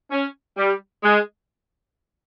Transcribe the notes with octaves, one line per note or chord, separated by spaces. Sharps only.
C#4
G3
G#3